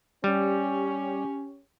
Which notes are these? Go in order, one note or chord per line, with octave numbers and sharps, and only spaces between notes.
G3 C#4 G4